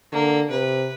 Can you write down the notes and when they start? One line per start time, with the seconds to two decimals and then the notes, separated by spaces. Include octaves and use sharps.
0.12 D3 A#3
0.50 C3 B4